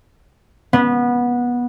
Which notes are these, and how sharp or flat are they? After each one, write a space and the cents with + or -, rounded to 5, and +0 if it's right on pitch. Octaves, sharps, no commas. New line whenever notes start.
B3 -20